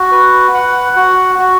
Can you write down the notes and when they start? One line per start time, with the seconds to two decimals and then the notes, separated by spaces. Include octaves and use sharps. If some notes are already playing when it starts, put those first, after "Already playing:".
Already playing: F#4
0.12 B4
0.54 F#5
0.96 F#4
1.39 F#4